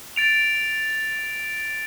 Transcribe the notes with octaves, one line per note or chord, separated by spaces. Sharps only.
A6 D7 F7